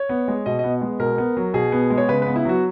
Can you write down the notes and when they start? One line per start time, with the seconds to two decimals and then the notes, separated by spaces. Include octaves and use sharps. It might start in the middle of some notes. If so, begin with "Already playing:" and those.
Already playing: C#5
0.09 B3
0.28 G#3
0.46 B2 D#5
0.59 B3 D#5
0.81 G#3
0.99 B2 A#4
1.18 B3
1.37 F#3
1.54 B2 G#4
1.72 B3
1.90 G#3
1.98 C#5
2.09 C#3 B4
2.22 B3 B4
2.36 E4
2.45 F#3 F#4